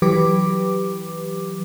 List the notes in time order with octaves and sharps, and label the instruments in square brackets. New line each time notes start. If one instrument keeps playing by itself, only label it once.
[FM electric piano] E3 F#3 G4 B4 D6